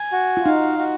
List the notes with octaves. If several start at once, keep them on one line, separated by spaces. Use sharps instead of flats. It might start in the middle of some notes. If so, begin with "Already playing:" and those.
Already playing: G#5
F#4
F4
D#4 F5
F#4